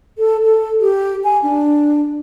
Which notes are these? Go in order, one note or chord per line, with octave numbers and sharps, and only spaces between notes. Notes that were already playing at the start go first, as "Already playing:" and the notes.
A4
A4
G4
G#5
D4